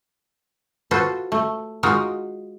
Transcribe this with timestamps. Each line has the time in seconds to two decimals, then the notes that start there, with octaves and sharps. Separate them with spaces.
0.91 F4 F#4 A4 B4 C5
1.32 A3
1.83 G#3 D#4 F4 F#4 A#4